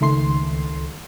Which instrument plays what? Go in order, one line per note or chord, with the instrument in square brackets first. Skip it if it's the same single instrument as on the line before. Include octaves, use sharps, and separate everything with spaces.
[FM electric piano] C#2 D#3 A3 C6 C7